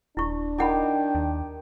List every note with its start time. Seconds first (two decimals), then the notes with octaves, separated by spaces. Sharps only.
0.17 D#1 D4 E4 C#6
0.58 D#3 E4 G4 F#5 B5
1.15 D#2